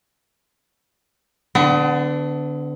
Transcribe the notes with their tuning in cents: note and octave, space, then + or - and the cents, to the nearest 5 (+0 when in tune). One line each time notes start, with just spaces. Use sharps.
D3 +0 B3 +40